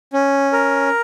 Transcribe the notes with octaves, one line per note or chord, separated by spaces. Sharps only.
C#4
A#4